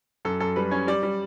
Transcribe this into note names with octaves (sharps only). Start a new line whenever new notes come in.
F#2 A4
F#2 A4
G3 B4
C#4 C#5
G3 D5
G3